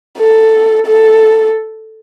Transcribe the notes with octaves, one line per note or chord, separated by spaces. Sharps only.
A4
A4